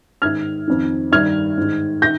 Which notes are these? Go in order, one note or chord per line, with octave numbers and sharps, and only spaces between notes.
G#2 D#3 F6 G#6
F2 D#3
G2 D#3 F6 G#6
G#2 D#3
D#3 G6 A#6